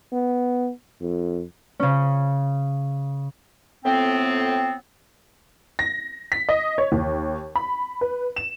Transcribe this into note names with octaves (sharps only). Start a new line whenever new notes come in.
B3
F2
C#3 C#4
F2 A2 B3 C4
A#6
B6
D#5
C#5
D#2
B5
B4
E7